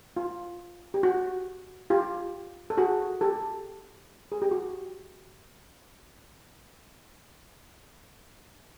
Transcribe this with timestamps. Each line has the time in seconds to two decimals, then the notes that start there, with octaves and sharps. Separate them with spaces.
0.17 F4
0.94 G4
1.03 F#4
1.90 F4 G4
2.70 A4
2.77 F#4 G#4
3.21 G4 A4
4.32 G#4
4.42 G4
4.51 F#4